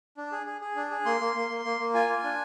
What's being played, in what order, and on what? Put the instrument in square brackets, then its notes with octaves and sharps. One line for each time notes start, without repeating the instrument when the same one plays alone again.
[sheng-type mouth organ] D4
G#4
G#4
G#4
D4
G#4
A#3 C6
A#3
A#3
A#3
A#3
A#3
F4 G#5
F4
D4